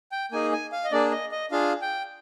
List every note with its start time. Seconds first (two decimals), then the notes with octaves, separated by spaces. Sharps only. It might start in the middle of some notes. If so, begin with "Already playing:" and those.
0.12 G5
0.32 A#3 D#4 G#4 G#5
0.52 G#5
0.72 F5
0.84 D#5
0.91 A#3 D4 G#4 D5
1.11 D#5
1.32 D#5
1.51 D4 F4 G#4 F5
1.82 G5